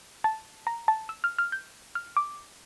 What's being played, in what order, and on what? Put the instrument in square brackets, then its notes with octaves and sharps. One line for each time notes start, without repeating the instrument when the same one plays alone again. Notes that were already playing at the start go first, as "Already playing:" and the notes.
[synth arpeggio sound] A5
A#5
A5
E6
F6
F6
G6
F6
D6